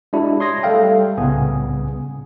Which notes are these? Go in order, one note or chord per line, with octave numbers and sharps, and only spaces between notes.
G#3 D4 E4 F#4 G4
C#5 C6 D#6 G#6 A#6
G3 A3 A4 E5 F5 G5
C2 A2 C#3 B3 G#5 D#6